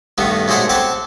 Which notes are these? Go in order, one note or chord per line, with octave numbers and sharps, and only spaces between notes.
G2 D#3 A3 B3
B1 G#3 A3 G#4 C5 F#5
C4 G4 F#5 A5